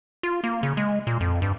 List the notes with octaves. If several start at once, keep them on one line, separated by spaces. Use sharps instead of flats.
F4
A#3
C#3
G#3
A#2
F2
G2